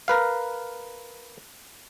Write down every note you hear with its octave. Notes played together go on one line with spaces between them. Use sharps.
A#4 B4 F5